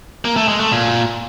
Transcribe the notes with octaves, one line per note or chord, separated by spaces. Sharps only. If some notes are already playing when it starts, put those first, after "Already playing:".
A#3
A3
G#3
A3
A#2